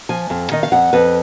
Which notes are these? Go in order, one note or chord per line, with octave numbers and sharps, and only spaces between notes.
F3 G#5
F2
D#3 D#5
F5
F2 F#5
F2 B4